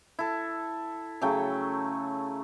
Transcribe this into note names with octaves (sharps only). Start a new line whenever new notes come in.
E4 A4
C#3 F#3 A3 G5